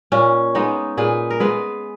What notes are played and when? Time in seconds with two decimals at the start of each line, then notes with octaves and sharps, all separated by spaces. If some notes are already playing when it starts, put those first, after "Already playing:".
0.12 A#2 C#4
0.55 G#3 B3 D#4
0.97 A#2 G#4 B4
1.30 A#4
1.40 G#3 B3 G#4 B4